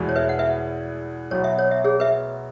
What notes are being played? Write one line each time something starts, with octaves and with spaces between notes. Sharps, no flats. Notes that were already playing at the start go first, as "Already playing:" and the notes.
Already playing: E2 B2 G#3 E4
C#5
B4 E5
F#5
B4 E5
B1 B2 F#3 B3 F#4 C#5
E5
C#5
E5
G#4 C#5
B4 E5